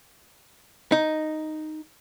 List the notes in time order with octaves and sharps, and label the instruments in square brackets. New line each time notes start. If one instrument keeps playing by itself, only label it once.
[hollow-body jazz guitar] D#4